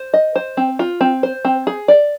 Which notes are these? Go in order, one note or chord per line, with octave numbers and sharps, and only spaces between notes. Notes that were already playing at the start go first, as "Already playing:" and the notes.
Already playing: C5
D#5
C5
C4
F4
C4
C5
C4
G#4
D5